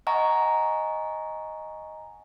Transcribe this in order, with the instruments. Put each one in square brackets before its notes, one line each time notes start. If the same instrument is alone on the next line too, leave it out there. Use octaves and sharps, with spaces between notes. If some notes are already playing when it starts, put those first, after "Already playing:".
[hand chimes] D#5 F#5 G#5 A#5 C#6